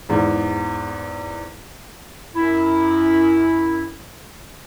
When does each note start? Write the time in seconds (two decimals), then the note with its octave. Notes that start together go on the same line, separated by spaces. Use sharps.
0.09 E2 G#2
2.36 F#2 E4